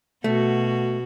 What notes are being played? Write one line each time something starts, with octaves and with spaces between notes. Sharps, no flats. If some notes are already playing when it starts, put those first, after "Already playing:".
B2 A3 F#4